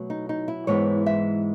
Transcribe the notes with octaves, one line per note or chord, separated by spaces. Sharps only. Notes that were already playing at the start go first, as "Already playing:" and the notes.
Already playing: B2 F#3 A3
D#4
D#4
E4
G#2 E3 G#3 B3 C#5
E5